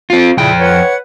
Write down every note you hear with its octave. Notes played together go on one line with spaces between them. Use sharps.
C4 F4
F2 A#2 C#3 E4 G5
B4 C#5 F#5